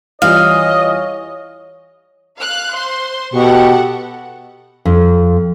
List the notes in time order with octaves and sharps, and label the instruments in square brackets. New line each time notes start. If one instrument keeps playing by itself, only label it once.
[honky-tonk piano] E3 G3 F4 [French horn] C#5 [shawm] D#5 [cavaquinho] F5
[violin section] F5 F#6
C5 C6
[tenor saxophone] B2 [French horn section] G4 [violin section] A4 F#5 C#6
[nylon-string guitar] F2